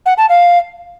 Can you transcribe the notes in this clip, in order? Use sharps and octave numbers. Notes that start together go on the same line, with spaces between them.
F#5
A5
F5